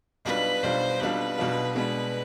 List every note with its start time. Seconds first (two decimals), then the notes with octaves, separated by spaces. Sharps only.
0.25 B1 B2 G3 D4 F4 B4
0.63 B1 B2 G3 D4 F4 C5
1.00 B1 B2 G3 D4 F4 B4
1.38 B1 B2 G3 D4 F4
1.75 B2 G#3 B3 D4 B4